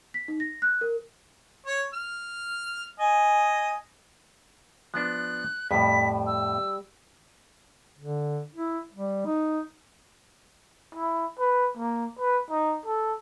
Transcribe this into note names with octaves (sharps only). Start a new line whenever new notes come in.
B6
D#4
A#6
F#6
A#4
C#5
F6
D#5 G#5
F3 B3 D4 F#6
F2 A2 G3 B6
E6
D3
E4
G3
D#4
E4
B4
A#3
B4
D#4
A4